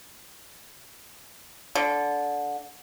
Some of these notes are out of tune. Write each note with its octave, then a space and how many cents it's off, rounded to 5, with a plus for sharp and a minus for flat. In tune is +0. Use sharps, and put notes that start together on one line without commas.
D3 -15